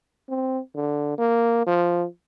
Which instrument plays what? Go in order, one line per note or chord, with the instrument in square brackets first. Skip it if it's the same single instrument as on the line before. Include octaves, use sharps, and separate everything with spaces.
[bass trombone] C4
D3
A#3
F3